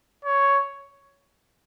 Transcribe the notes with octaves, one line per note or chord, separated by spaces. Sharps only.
C#5